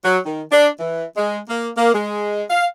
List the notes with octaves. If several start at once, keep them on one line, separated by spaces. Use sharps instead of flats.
F#3
D#3
D4
E3
G#3
A#3
A#3
G#3
F5